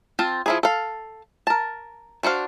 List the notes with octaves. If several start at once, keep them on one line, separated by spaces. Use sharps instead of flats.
C4 F4 A5
F3 E4 G#4
A4 F5
A#4 A5
D4 F#4 C5 F5